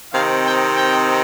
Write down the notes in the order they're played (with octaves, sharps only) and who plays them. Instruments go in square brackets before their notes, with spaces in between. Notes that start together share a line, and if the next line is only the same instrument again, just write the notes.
[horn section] C3 D#3 C4 D#4 F5
G5
G5